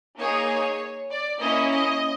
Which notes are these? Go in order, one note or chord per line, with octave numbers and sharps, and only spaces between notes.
A#3 D#4 G#4 C#5
D5
A#3 C#4 E4 D#5
D#5